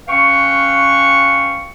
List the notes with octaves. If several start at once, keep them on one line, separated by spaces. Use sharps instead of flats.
C#4 B4 F5 G5 C#6